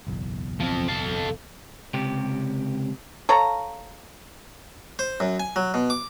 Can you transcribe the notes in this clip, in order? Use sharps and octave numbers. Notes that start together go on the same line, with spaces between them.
F#1 B1 E2
F3 C4
A4 F5
C#2 C3 G4
A4 C#5 F5 A#5
C5
F#2
G#5
F#3
B2
D6